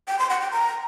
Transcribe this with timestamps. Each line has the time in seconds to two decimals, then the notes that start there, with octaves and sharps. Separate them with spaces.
0.08 G5
0.19 C6
0.30 F#5
0.41 G5
0.52 A#5